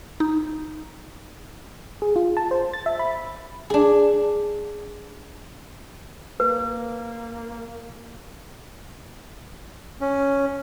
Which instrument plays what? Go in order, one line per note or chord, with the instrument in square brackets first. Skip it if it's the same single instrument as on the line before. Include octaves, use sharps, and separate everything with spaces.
[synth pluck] D#4
[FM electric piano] G#4
F4
A5
C5
A6
E5
B5
[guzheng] D4 G#4
[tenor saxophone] A#3 [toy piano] B4
[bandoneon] C#4